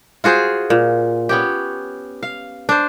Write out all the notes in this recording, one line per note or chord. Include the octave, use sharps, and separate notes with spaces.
F4 F#4 G#4 C5
A#2
B3 C#4 G4
F5
D4 C5